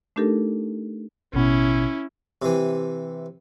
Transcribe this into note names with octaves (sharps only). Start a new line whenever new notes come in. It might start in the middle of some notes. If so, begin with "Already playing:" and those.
A3 D4 D#4 G4 A4 A#4
A1 B2 C#4 E4
C3 E3